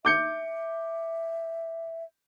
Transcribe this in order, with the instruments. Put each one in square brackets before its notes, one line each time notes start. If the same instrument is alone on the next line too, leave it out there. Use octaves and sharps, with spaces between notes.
[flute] E5 [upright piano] D6 G6 C#7